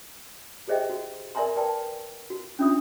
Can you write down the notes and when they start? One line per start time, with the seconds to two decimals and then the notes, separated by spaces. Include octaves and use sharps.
0.68 G4 G#4 C5 D#5 E5 G5
0.90 F#4
1.35 A#4 D5 E5 G#5 A#5 C6
1.56 A#4 B4 D5 G5 A5
2.30 F#4
2.59 C#4 D4 F4 E5 D#6